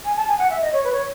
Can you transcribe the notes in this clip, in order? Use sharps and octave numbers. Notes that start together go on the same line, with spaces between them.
G#5
A5
G#5
F#5
E5
D#5
C#5
B4
C#5